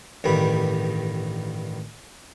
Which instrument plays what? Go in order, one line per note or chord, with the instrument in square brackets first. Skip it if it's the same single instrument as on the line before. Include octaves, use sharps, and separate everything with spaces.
[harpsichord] A1 G2 D#3 G3 B5